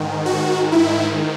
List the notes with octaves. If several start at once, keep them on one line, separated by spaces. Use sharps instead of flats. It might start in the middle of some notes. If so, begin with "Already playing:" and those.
Already playing: G#2 D#3
F#4
E4